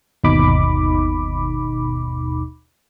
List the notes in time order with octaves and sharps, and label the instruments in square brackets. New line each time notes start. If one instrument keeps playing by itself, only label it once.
[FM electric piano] G1 D#2 B2 D#4 B5 D6